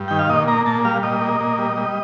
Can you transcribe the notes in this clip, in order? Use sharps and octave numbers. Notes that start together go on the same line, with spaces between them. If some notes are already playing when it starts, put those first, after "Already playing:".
Already playing: G2
D#3 G5
F5
A#2 D#5
A#3 A#5
A#2 A5
G3 F5
A#2 D#5
A#3
A#2
G3
G3